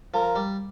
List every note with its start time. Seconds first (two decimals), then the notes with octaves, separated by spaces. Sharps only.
0.14 F3 A#4
0.36 G3